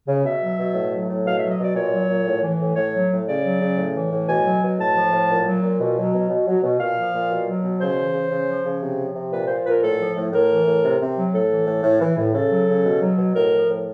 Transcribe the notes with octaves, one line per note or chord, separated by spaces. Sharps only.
C#3
B2 E5
F#3
B2
A2
F#3
A2
B2 F5
E5
F#3
D#5
B2 D5
A#2 C#5
F#3
A#2
A2
E3
A2
A2 C#5
F#3
A2
C#3 D5
F#3
C#3
A2
E3
A2
B2 G#5
F#3
B2
A2 A5
F3
A2
A#2
F#3
A#2
B2
F#3
B2
B2
F#3
B2
A#2 F5
F3
A#2
B2
F#3
B2
C#3 C5
E3
C#3
C#3
F3
C#3
C3
F3
C3
A#2 B4
F3 C5
A#2 A#4 B4
A2 A4
F3
A2
A2 A#4
E3
A2
C3
C3
F#3
A2 A4
E3
A2
A2
E3
A2
C#3 A4
F#3
C#3
B2
F#3
B2
A2 A#4
F3
A2